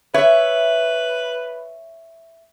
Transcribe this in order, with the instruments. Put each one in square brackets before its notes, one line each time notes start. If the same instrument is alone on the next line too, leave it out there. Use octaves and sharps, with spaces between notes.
[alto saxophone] B4 [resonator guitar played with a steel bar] C#5 E5